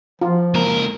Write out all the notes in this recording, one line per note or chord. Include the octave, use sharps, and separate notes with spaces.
F3 F4
C#2 A#3 A#4